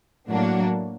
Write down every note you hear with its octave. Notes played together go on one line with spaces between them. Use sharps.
A2 F#3 A#3 D4 F#4